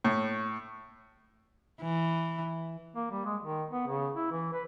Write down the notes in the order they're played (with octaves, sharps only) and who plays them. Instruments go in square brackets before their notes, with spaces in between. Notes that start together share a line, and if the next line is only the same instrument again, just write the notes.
[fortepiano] A2
[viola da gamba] E3
[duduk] A#3
G3
G#3
D#3
B3
C#3
E4
E3
B4